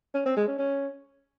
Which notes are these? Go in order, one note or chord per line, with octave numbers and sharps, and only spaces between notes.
C#4
C4
G#3
C#4
C#4